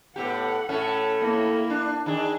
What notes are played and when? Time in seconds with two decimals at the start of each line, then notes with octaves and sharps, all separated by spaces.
0.16 A2 B3 G4 F#5
0.69 A2 A3 C#4
1.20 A#3 E4
1.70 D4
2.06 D#3 D4 G#4